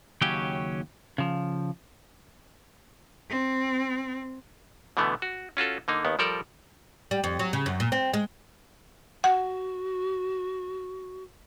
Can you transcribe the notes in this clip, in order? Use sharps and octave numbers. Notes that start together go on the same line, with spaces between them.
D#2 C#3 F#3 C#4 G4 G5
C#3 F3
C4
B2 D3 E3 A3 B3
F#4
C#4 F4 F#4 A4
D3 A#3 D#4
D#2 D#3 B3
F3 G3 A4 A#4 D5
G3
F2
F#3
C#3
F#2
A#2
C4
G#3
F#4 F#5